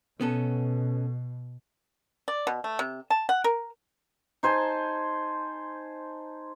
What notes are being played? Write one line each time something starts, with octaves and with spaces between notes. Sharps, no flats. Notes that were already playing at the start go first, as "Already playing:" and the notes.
B2 B3 C#4 A4
D5
B2
A3
C3
A5
F#5
A#4
D#4 C5 G#5 A5